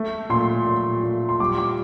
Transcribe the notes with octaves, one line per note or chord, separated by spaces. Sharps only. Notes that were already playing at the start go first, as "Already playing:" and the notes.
Already playing: A3
A#2 C6
A#2
A#2
C6
G3 D6
D6